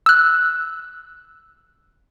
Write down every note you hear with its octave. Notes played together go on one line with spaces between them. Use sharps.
E6 F#6